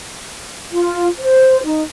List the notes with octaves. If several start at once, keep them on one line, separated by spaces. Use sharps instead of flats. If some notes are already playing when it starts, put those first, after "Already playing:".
F4
C5
D#4